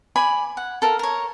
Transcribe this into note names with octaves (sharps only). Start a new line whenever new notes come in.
D5 G#5 B5
F#5
A4 A#4 F5
A#4 C#5